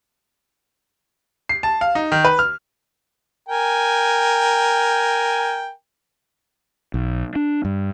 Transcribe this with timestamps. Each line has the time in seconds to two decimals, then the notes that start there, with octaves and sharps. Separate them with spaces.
1.49 C7
1.63 A5
1.81 F5
1.95 D#4
2.12 D#3
2.25 B4
2.39 F6
3.49 A#4 G5 G#5
6.94 B1
7.36 D4
7.65 G2